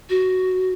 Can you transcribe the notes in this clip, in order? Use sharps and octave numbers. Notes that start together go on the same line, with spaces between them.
F#4